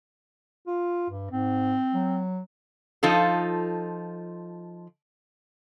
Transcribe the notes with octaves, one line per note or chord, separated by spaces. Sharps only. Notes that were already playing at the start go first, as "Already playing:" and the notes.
F4
G2
G#2 C4
F#3
F3 D#4 F4 A4